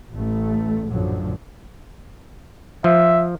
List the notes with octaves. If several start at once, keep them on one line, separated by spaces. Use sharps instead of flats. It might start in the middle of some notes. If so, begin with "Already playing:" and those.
A1 A3
A#1 F#2 A2 D3 F3 F#3
F3 E5